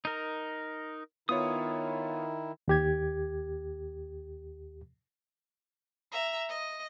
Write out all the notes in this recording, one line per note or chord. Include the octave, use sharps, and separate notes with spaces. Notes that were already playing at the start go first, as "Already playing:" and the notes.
D#4 A#4
D#3 B3 E4 F4 C#5 D#6
D#2 G4 G#6
E5 A#5
D#5